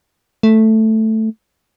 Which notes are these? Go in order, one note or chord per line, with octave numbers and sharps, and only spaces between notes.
A3